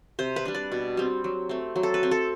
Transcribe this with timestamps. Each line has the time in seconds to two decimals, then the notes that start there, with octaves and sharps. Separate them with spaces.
0.19 C3 C5
0.36 B4
0.45 G3 D4
0.55 D5
0.72 B2
0.97 G3 C4
1.24 F#3
1.49 A3 C4
1.76 F#3
1.83 A4
1.94 B4
2.03 C4
2.11 A4